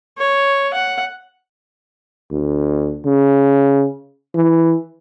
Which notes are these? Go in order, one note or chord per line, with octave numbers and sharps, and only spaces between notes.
C#5
F#5
D2
C#3
E3